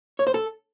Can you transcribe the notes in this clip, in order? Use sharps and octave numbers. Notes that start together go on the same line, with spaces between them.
C#5
C5
A4